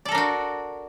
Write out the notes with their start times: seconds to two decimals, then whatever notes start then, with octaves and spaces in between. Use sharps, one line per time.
0.05 D5
0.09 A4
0.12 A#4
0.15 D4
0.18 F#4